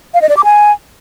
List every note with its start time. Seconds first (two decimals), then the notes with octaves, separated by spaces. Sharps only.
0.14 F5
0.21 D#5
0.29 D5
0.37 D6
0.44 G#5